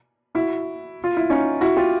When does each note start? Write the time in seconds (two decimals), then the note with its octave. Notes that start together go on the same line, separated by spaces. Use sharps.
0.35 E4 F#4
1.04 F4
1.17 E4
1.30 C#4 D#4
1.61 E4 F#4
1.77 F4 G4